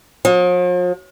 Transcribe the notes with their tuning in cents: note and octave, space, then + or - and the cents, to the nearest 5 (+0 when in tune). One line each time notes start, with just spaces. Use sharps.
F3 +45